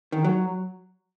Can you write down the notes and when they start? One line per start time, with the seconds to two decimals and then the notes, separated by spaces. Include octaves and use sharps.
0.12 D#3
0.24 F#3